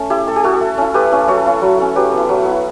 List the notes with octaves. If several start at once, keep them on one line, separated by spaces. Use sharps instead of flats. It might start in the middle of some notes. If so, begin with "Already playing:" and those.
Already playing: A3 C#4
E4 G4
A3 A4
G4
E4 F#4 A4
A3
C#4 E4
A3 G4 B4
C#4 E4
F#3 A4 C#5
C#4 E4
F#3
C#4 E4
F#3 G4 B4
B3
E4
F#3
B3
E4